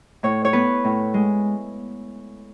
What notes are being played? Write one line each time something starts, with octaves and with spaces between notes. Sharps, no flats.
A2 C#5
C#5
B3 B4
A2
G#3